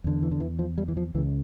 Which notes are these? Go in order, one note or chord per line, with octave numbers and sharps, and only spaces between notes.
E2 D3
E3
D3
E3
F3
G3
E3
F3
C#2 C#3 E3